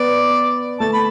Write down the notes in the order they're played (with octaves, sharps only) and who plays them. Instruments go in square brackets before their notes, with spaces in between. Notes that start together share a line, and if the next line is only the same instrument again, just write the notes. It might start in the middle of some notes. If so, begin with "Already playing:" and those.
Already playing: [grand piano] B3 [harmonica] D5
[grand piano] A3 [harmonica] A5
[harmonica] B5